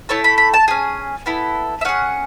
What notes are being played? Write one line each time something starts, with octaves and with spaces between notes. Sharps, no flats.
A3 E4 A4 C#5
B5
B5
A5
C#4 G#4 G#5
B3 E4 A4
E5
C#4 G#4 F#5